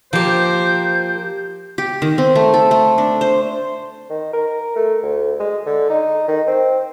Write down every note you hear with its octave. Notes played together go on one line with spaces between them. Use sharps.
F3 A#3 G4 C5 G6
G4
D#3
C4
A3
A4
A3
D4
C5
D#3
A#4
A3
D2
G#3
D3
D#4
D#3
C4